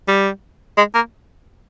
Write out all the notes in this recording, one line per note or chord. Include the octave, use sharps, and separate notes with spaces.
G3
G#3
A#3